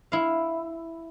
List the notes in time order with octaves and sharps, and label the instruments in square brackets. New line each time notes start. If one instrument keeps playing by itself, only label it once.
[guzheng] E4 F5